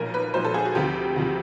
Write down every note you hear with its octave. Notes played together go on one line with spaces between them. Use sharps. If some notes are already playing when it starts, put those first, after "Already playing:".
Already playing: B1 A#2 F3 A#4
B4
B1 A#2 F3 C5
A4
G#4
F#4
D2 C3 F3 G4
D2 C3 F3